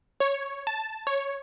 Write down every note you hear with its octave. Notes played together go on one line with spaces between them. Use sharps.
C#5
A5
C#5